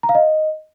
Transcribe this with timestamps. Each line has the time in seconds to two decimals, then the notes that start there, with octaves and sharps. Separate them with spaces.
0.03 A#5
0.09 F5
0.15 D#5